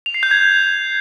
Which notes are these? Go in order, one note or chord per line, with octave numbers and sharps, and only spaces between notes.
F7
C7
G6
G#6